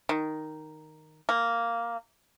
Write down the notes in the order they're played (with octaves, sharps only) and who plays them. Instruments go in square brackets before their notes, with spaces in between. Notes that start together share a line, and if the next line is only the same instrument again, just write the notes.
[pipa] D#3
A#3